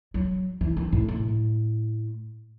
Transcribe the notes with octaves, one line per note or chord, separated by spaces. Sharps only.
F#3
E3
D#3
A2
A2